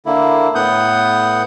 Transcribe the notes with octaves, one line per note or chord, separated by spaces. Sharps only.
D3 A#3 E4
A2 B3 F#5 D#6 G6